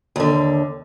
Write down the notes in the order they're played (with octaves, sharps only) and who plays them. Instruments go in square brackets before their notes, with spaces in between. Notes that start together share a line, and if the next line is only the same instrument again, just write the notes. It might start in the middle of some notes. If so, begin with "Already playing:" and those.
[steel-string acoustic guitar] D#2 D3